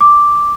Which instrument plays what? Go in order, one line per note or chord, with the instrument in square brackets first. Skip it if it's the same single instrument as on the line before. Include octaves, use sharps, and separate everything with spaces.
[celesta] D6